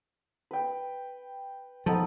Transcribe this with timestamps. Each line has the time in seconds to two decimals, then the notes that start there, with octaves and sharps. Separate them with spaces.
0.51 B4 G5
1.86 F3 B3 D#4 A4